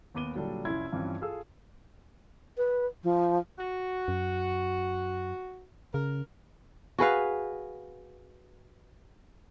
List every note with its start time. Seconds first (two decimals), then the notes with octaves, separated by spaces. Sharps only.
0.15 D#2 B3 D6 D#7 G7
0.35 A#2 D3 F#3 G3 D4 A4
0.65 C2 F2 C#4 E4 C6 G#6
0.92 G2 E3 F3 C4 C#4
1.21 F4 G#4 A4 E6
2.57 B4
3.03 F3
3.59 F#4
4.08 F#2
5.94 C#3 A#4
6.99 F#4 G#4 B4 F5